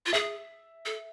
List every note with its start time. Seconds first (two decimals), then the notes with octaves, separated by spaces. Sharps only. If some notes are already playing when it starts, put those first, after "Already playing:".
0.06 F4
0.13 G#4 E5
0.85 A4